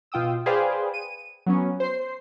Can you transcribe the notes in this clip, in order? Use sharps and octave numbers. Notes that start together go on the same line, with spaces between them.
B2 F4 G5 D#6 E6
G#4 B4 C5 D5 F5 G5
D#7
F#3 B3 C#4
C5 C7